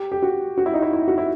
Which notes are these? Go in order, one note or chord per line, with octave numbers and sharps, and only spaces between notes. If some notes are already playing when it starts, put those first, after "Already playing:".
Already playing: G4
G4
F#4
F#4
E4
D#4
E4
E4
F#4
E4